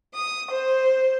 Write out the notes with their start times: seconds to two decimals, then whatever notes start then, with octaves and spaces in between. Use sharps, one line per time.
0.14 D#6
0.51 C5